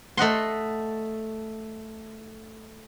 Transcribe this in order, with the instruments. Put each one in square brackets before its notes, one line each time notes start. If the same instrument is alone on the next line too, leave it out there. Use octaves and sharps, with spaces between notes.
[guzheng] A3 D#5 F#5 C6